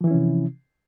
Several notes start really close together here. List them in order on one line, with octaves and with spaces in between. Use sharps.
F3 E3 E4 C#4 C3